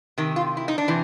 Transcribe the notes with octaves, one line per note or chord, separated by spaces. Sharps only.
C3 D#3
F4
E4
D#4
D4
C3 E3